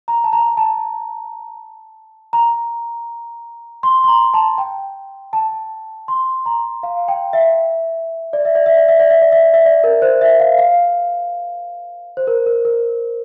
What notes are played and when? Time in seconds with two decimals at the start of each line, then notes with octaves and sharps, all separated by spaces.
0.08 A#5
0.24 A5
0.33 A#5
0.57 A5
2.33 A#5
3.83 C6
4.04 C6
4.08 A#5
4.34 A5
4.58 G5
5.33 A5
6.08 C6
6.46 A#5
6.83 F5
7.08 G5
7.33 E5
8.33 D5
8.45 E5
8.55 D5
8.66 E5
8.77 D5
8.88 E5
9.00 D5
9.10 E5
9.22 D5
9.32 E5
9.43 D5
9.54 E5
9.65 D5
9.84 A#4
10.02 C5
10.21 E5
10.40 F5
10.59 F5
12.17 C5
12.27 A#4
12.46 A#4
12.65 A#4